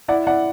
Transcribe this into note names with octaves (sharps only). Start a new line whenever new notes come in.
E4 D5 F#5
E4 D5 F#5